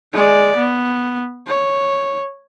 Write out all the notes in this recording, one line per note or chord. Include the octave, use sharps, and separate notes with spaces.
G#3 D5
B3
C#5